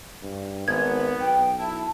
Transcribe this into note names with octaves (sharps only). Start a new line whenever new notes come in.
G2
G#1 B3 G#6
B1 G5
E4 A5